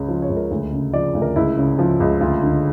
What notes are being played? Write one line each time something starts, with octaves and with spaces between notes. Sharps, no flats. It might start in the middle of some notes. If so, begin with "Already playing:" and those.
Already playing: C#2 C#3
F3
C#5
C#2
A#4
D2
C#3
F3 D5
D2
A#4
C#2 E4
C#3
F3
C#2
D2 F4
D3